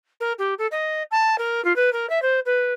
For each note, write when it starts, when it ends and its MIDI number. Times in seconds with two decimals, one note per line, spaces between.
0.20 0.33 70
0.38 0.54 67
0.58 0.67 69
0.71 1.03 75
1.11 1.38 81
1.38 1.63 70
1.64 1.75 65
1.76 1.92 71
1.92 2.09 70
2.09 2.21 76
2.22 2.39 72
2.45 2.73 71